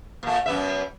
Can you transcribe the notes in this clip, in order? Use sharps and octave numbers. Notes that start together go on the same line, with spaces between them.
A#2 A3
F#2 B3 E5